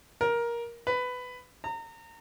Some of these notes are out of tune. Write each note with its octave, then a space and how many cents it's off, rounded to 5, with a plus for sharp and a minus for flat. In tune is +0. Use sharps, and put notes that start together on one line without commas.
A#4 +15
B4 +15
A#5 -30